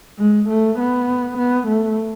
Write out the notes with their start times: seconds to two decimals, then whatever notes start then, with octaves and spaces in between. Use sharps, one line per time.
0.18 G#3
0.48 A3
0.79 B3
1.38 B3
1.67 A3